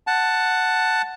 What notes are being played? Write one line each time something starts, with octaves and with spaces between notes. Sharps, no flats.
F#5 A5